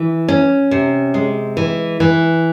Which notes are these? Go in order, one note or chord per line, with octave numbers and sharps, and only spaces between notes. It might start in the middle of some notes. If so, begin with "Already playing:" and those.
Already playing: E3
C#4
C3
G#3
E3
E3